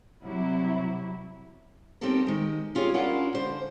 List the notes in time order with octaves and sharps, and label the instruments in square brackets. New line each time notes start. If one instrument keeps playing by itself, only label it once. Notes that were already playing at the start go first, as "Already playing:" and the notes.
[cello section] C3 G3 E4 [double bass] F#3
[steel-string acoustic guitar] C4 C#4 D#4 G4 A4 A#4
D#3 G#3
C#4 F4 G4 G#4 C#5
C#4 D4 E4 F4 A#4 F#5
D3 C5